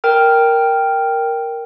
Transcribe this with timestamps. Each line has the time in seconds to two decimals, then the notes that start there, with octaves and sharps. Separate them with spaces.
0.04 A#4 G5 F6